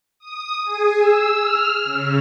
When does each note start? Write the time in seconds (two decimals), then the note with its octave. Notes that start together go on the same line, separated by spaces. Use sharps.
0.19 D#6
0.64 G#4
0.97 E6
1.41 F6
1.85 C#3